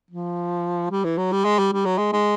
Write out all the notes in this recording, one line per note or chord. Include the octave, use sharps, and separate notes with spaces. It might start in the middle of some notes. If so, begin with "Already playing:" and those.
F3
G3
E3
F#3
G3
G#3
G3
G3
F#3
G#3
G#3